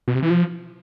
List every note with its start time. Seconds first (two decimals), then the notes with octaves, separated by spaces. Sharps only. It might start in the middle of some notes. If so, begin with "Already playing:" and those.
0.08 B2
0.15 C3
0.23 E3
0.30 F3